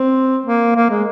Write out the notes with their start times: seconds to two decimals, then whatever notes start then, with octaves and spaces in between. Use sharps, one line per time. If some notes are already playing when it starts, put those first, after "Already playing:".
Already playing: C4
0.46 A#3
0.76 A#3
0.90 G#3